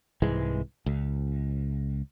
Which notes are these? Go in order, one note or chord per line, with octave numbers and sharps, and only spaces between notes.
C2 G#2 E3 G#3
C#2